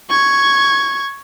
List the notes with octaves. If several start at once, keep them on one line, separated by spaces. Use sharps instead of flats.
C#6 G#6